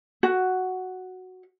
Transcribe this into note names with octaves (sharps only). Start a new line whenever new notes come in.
F#4